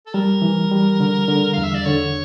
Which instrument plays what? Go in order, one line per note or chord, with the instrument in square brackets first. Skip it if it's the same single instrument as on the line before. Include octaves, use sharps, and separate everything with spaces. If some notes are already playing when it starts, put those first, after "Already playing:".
[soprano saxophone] A4
[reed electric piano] G3 [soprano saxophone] A#4
[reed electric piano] E3
G3
D3
D3
[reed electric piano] E2 [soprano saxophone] F5
[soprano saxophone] E5
D5
[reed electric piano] D3 [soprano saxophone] C#5